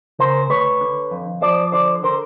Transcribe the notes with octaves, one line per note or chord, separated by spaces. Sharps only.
C#3 A#4 C5
D2 B4 C#5
D3
F2
F3 C5 D5
D3 C5 D5
D3 A#4 C5